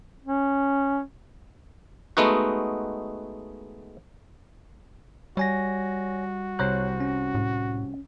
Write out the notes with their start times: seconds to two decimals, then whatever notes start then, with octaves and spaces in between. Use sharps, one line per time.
0.24 C#4
2.17 G#3 A3 B3 D#4 F#4
5.37 G3 F#4 C#5 G#5 A#6
6.59 C2 C5 C#5 A#5 F#6
7.00 C#4
7.35 A2